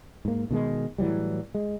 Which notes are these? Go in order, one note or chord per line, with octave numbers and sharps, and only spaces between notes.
G#2 A#3
B2 D#3 G#3
A2 E3 F#3 G3
G#3